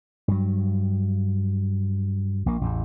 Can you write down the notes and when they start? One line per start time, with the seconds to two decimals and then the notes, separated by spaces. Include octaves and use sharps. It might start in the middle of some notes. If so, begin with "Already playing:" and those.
0.28 G2 F#3
2.46 A#1 A#3
2.61 A1 E2